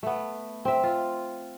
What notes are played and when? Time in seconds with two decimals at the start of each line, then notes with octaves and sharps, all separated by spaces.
0.03 A3 B3
0.65 C4 E5
0.84 F4